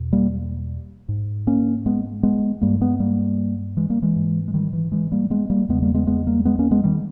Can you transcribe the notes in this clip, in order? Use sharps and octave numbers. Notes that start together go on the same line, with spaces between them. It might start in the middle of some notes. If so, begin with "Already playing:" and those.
Already playing: E2 B2
G3 A#3
G#2
A#3 C#4
G#3 B3
G#3 B3
G2 G3 A#3
G#3 B3
G3 A#3
E3 G#3
G3 A#3
E3 G#3
G#2
G#3
D#3 G3
E3
E3 G#3
G3 A#3
G#3 B3
G3 A#3
E2 C#3 G#3 B3
G3 A#3
G#3 B3
G#3 B3
G3 A#3
G#3 B3
A#3 C#4
G#3 B3
D#3 G3